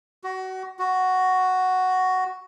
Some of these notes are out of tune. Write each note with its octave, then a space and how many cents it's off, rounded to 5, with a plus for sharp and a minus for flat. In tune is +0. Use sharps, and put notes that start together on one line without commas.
F#4 +25
F#4 +5